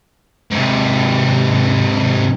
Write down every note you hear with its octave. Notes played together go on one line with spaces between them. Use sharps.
G#2 C3